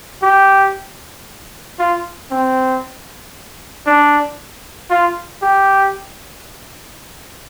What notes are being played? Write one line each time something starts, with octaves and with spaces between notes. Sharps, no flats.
G4
F4
C4
D4
F4
G4